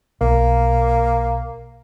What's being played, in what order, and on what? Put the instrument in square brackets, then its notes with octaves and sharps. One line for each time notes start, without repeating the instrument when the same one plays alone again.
[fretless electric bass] B1 [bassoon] A#3